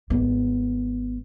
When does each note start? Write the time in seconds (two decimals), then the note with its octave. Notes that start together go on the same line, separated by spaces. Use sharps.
0.10 G#1 B3